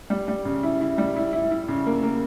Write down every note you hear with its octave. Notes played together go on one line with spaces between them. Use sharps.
G3
G3
C#3
E4
E4
G3
E4
E4
E4
C#3
A#3
A#3